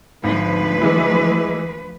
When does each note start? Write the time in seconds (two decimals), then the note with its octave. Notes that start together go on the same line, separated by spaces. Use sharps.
0.24 G#1 D2 F3 B4
0.82 E3 G#3 E4